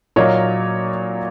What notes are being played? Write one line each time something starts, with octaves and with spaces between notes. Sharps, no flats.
A#2 F#3 A#3 C#5 D#5